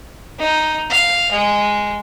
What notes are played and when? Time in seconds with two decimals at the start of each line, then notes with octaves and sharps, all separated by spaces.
0.39 D#4
0.90 F5
1.32 G#3